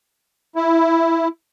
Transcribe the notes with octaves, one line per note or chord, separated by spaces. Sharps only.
E4